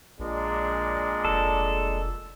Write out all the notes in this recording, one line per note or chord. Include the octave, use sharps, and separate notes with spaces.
A#1 A#2 G#3 D4
F1 A4